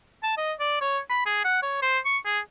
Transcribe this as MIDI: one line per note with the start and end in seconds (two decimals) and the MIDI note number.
0.23 0.36 81
0.37 0.53 75
0.60 0.78 74
0.81 0.99 73
1.10 1.23 83
1.26 1.42 68
1.44 1.60 78
1.62 1.80 73
1.82 1.99 72
2.05 2.17 85
2.25 2.39 68